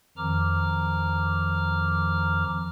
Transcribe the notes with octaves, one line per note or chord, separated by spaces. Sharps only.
F2 D#3 F3 A#5 D6 F6